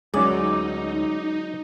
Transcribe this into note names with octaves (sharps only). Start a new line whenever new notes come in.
D2 F#3 G#3 C#4 D#4 G#4 D5